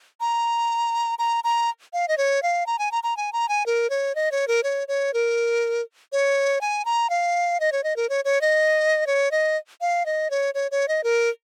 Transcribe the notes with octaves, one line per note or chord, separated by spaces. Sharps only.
A#5
A#5
A#5
F5
D#5
C#5
F5
A#5
G#5
A#5
A#5
G#5
A#5
G#5
A#4
C#5
D#5
C#5
A#4
C#5
C#5
A#4
C#5
G#5
A#5
F5
D#5
C#5
D#5
A#4
C#5
C#5
D#5
C#5
D#5
F5
D#5
C#5
C#5
C#5
D#5
A#4